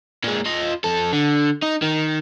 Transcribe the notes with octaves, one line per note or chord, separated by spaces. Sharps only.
A#2 G#3
F4 D#5
F2 A4
D3
D#4
D#3